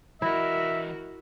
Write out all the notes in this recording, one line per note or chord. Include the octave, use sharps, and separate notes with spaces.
E3 E4 F#4 A#4 D#5 E5